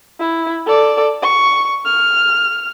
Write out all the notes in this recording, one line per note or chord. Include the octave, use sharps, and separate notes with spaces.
E4
A4 D5
C#6
F6